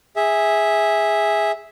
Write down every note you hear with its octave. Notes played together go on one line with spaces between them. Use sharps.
G#4 E5